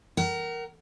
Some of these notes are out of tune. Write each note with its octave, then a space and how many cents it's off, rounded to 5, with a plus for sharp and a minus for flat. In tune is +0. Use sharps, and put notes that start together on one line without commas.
A#4 +0 F#5 +40